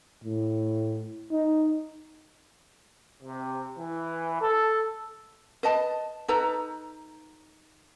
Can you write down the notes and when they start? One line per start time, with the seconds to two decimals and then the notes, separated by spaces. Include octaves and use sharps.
0.24 A2
1.31 D#4
3.23 C3
3.77 E3
4.41 A4
5.63 B4 D#5 A5
6.28 D#4 A4 B4 A#5